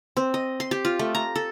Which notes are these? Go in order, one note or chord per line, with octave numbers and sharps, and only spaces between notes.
C4
D#5
C6
G4
F4
A3
A#5
A4